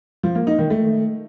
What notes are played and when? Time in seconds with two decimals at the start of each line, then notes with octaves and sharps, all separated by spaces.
0.23 F3
0.35 A#3
0.47 D#4
0.59 D#3
0.70 A3